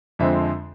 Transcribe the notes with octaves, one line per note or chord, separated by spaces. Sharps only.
F2 D3 F3 G#3 C4 E5